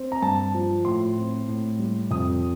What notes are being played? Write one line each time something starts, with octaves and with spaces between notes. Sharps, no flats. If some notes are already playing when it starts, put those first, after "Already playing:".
Already playing: C4
A#5
G2 A5
F3
A2 C6
C4
A2
G3
F2 D#6